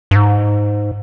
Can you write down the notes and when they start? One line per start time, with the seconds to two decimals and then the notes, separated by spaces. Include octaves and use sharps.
0.11 G2
0.15 G#2